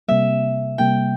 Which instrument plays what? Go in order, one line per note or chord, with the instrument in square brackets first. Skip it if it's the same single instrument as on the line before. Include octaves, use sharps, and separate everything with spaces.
[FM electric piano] C3 G3 A#3 [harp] E5
[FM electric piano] C3 G3 A#3 [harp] G5